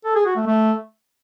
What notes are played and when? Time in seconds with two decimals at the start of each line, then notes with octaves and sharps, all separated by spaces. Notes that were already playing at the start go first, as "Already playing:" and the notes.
0.05 A4
0.15 G#4
0.26 F#4
0.36 A3
0.46 A3